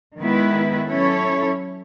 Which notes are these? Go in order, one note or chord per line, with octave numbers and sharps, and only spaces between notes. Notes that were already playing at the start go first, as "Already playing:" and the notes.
D#3 G#3 B3 E4 B4
F#3 C#4 E4 A4 C#5